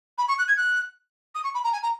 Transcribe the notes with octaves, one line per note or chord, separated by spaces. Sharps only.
B5
C#6
F#6
G#6
F#6
D#6
C#6
B5
A#5
G#5
A#5